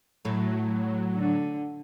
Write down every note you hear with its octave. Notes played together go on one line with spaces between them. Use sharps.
A2 F#3 A3
D3